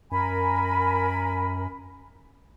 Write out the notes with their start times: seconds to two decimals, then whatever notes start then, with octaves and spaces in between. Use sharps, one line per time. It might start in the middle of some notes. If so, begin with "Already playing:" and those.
0.11 F#2 A#4 G#5 B5